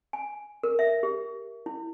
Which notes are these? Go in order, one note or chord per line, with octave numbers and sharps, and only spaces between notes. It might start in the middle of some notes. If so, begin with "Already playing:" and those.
G#5
A#4
E5
G4
E4